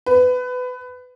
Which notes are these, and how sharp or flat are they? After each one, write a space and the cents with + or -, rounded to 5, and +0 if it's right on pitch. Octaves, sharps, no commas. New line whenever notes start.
B4 +25